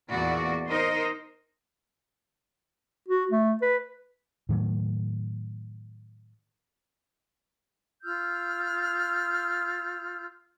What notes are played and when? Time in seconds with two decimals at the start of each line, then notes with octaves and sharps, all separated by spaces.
0.11 E2 A#2 F#4 D5
0.69 D#4 A#4 C5 D#5
3.08 F#4
3.31 A3
3.62 B4
4.49 A2 D#3 F#3 A3
8.04 F4 E6 F6 G6